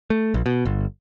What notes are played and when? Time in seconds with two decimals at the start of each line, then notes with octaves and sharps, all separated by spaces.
0.10 A3
0.34 A#1
0.46 B2
0.65 G1